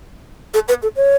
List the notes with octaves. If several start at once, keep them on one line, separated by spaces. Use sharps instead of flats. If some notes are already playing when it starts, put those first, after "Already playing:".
A4
B4
A4
C#5